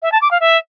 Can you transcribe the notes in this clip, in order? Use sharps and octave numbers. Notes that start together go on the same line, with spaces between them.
E5
A5
D6
F5
E5